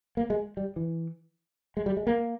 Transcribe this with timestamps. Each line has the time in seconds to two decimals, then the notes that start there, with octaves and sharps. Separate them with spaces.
0.17 A#3
0.30 G#3
0.57 G3
0.76 E3
1.77 G#3
1.86 G3
1.97 G#3
2.07 A#3